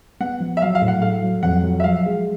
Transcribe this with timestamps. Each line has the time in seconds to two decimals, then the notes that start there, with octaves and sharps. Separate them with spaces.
0.20 B3 F#5
0.40 F3
0.57 E5
0.62 F#3 F5
0.75 F5
0.81 A2
0.88 F#5
1.02 A3 F5
1.22 F#3
1.43 F2 F#5
1.63 F#3
1.80 E5
1.84 F3 F5
2.05 G#3